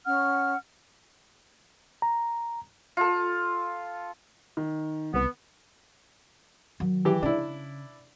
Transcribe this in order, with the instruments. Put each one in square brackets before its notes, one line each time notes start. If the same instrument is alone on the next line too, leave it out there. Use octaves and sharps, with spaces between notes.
[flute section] C#4 F#5 F6
[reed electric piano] A#5
[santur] F4 A4
[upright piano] D#3
[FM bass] C2 [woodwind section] B3
[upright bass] D#3 F#3
[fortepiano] E3 G4
[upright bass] C#3 [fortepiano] D4 E4